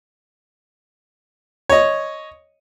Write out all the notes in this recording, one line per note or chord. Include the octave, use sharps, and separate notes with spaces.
C#5 D#5